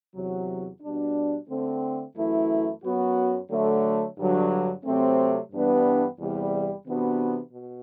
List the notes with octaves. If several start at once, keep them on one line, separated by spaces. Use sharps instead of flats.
E2 C3 F#3
B2 G3 D4
D3 A3 C4
F#2 E3 A3 E4
F#2 F#3 B3 F#4
D3 F#3 A3
G2 D3 F#3
C3 F#3 A3 C4
G2 E3 G3 B3 D4
E2 C3 E3 G3
C3 E3 B3 D4 F#4
B2